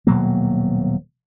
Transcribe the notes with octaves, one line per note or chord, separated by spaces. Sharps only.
D#1 B2 F#3 A#3